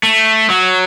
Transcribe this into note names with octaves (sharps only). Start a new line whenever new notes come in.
A3
F#3